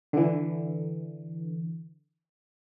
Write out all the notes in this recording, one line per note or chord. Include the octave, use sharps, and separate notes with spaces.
D3 E3